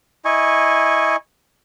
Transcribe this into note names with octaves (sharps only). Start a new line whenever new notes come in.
E4 D#5 G#5 C#6